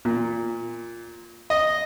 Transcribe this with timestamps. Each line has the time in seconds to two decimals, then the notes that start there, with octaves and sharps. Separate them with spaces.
0.05 A#2
1.50 D#5